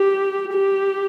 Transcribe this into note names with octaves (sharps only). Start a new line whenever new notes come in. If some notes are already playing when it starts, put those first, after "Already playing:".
Already playing: G4
G4